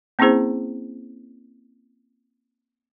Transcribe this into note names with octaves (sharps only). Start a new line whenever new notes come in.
A#3 C4 C#4 E4 G#4 C5